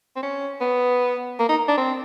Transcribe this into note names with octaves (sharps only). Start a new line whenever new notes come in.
C4
C#4
B3
A#3
D#4
D4
C4